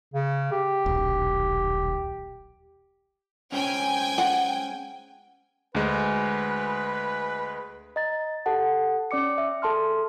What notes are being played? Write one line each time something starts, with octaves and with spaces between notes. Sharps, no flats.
C#3
G4
D#1 B1
G#3 C4 C#4 G5 G#5
F#5
D2 G#3 B4
D#5 A#5 A6
G4 A4 F#5 A5
C#4 D5 D6 C#7
E5
G#4 A4 A5 C6 F6